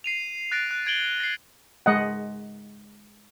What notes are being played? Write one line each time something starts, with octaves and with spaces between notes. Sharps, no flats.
C7 D#7 F7
F#6 A6 A#6 D7
F#6
G#6 D7 F#7 G7
A#6 C7
G#3 D#5 F#5